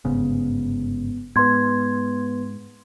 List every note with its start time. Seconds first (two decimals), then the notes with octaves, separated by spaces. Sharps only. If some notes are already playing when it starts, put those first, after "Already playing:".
0.05 G1 G#2 C#3 B3
1.36 G#2 B3 B4 C6 G#6